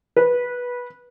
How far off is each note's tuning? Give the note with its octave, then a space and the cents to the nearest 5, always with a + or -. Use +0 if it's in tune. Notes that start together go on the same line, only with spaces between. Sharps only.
B4 -15